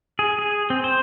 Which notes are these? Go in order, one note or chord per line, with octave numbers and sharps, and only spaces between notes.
G#4
G#4
C4
C5